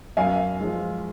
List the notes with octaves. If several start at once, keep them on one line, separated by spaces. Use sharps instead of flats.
F#2 F5 G#5
F3 G#3